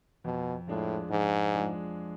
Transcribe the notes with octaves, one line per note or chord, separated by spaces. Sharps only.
F2 B2
A2 F3 G#3 D4 G#4
F2 G#2
F3 G#3 D4 G#4